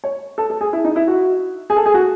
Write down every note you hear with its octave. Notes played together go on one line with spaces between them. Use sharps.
C#5
A4
A4
G#4
E4
D#4
E4
F#4
G#4
A4
G#4
F#4